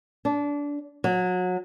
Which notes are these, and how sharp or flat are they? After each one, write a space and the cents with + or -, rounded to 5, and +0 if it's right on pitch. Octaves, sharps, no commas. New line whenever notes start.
D4 -25
F#3 -25